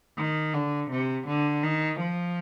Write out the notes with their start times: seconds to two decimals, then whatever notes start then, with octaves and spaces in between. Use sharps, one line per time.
0.18 D#3
0.54 D3
0.91 C3
1.27 D3
1.63 D#3
2.00 F3